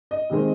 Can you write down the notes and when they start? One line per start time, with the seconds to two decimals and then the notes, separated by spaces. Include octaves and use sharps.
0.11 D#5
0.30 C3 D#3 G#3 C4